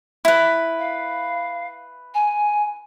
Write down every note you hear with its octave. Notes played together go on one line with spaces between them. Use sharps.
E4 B4
F5
G#5